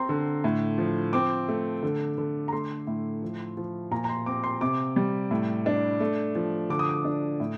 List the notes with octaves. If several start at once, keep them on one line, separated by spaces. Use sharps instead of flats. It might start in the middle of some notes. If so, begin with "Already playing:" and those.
Already playing: C4 A#5 C6
D3
A2
F3
C4 D6
A3
D3
D3
A#5
A3 C6
A2
F3
F3
A#2 A#5
A#5
C6
C4 D6
C6
C3 D6
G3
A2
D4
A3
F3
D3 D6
D#6
D6
D4
A2